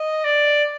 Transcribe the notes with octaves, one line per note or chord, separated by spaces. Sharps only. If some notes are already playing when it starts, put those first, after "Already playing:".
Already playing: D#5
D5